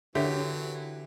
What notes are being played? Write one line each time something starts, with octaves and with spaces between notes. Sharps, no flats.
D3 E3 F#3 G4 A#4 C#5 E5